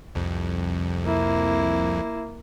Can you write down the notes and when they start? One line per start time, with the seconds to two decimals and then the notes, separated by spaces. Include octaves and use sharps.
0.15 C2 F2
1.04 A#3 E4